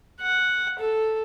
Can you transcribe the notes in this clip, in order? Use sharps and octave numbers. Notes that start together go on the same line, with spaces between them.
F#5
A4